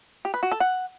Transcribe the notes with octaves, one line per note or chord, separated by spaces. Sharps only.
G4
B4
F#4
A4
F#5